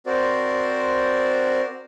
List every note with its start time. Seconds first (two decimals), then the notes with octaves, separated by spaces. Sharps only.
0.06 C4 F#4 A#4 C5 D5